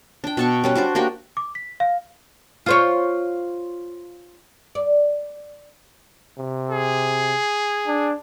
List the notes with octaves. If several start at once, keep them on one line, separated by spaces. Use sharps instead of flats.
D4 G5
B2 A5 C#6
G3 C#4 B4
D4 F#4 C5 D5
A#3 D4 F#4 G4
D6
B6
F5
F4 C5 C#5
D5
C3
G#4
D4